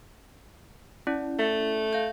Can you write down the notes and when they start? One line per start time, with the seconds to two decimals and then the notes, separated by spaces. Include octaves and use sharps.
1.07 C#4 E4 D5
1.39 A3
1.93 F5 G6